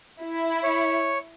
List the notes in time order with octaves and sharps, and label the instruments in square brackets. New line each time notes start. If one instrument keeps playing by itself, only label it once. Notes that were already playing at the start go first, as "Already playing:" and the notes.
[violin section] E4
[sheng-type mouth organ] C#5